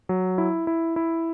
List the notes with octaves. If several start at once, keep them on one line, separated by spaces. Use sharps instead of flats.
F#3
E4
E4
E4